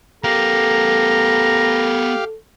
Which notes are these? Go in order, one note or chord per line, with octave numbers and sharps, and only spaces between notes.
B3 G4 A4 A#4 F5 A#5